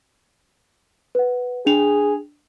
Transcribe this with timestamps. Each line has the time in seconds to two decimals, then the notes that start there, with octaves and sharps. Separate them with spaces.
1.15 B4 F#5
1.66 D4 G#4 F7